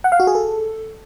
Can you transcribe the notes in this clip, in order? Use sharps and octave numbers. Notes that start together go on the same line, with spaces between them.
F#5
F5
F#4
G#4
A4